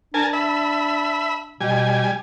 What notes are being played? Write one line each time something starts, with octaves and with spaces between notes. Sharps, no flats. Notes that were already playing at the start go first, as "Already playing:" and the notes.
D4 A#4 G#5 A5
E5 B5
B2 G3 G#5